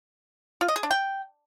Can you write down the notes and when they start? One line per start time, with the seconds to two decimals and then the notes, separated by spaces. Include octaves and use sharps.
0.61 F4
0.68 D#5
0.76 G#4
0.83 D4
0.91 G5